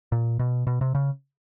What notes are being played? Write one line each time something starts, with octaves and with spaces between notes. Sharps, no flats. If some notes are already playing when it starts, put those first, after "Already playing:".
A#2
B2
B2
C3
C#3